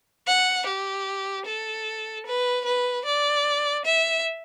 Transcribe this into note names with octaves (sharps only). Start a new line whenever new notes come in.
F#5
G4
A4
B4
B4
D5
E5